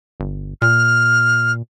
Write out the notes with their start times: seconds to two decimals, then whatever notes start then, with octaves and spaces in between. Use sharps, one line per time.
0.20 G1
0.62 A#2 F6